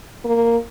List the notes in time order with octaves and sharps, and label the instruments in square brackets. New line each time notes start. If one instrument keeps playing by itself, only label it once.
[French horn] A#3